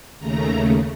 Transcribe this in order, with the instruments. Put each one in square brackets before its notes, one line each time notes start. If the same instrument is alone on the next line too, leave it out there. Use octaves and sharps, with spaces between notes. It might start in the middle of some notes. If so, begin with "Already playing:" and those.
[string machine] D#2 C#3 A3 A#5